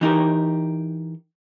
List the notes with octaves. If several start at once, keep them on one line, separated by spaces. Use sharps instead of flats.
E3 D#4 G4 A#4